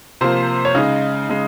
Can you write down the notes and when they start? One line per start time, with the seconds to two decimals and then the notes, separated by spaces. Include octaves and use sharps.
0.21 C3 F3 A#3 C5
0.65 C#5
0.75 C#3 G#3 D#4 D#5
1.29 C#3 G#3